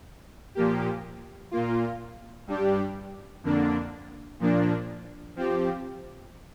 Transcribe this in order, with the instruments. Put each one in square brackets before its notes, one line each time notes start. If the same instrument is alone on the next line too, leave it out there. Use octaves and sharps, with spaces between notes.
[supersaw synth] A#2 F3 A#3 G4
A#2 A#3 F4
G2 G3 D4 G4
F2 D3 A#3 D4
A#2 F3 A#3 D4
F3 C4 G4